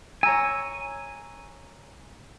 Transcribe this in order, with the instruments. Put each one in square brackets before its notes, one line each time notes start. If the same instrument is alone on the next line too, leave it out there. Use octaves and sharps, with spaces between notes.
[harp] C#5 A#5 E6 [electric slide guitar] G#5